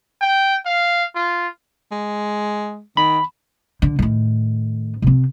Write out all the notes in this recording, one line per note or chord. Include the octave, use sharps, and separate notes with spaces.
G5
F5
F4
G#3
D#3 B5
D3
A2 D#3
C3 C4